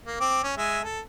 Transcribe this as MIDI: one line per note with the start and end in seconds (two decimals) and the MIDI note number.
0.06 0.20 58
0.20 0.41 60
0.20 0.41 86
0.43 0.53 61
0.57 0.82 56
0.57 0.82 76
0.57 0.82 80
0.83 1.00 69